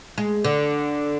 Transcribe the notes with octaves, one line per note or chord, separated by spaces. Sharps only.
G#3
D3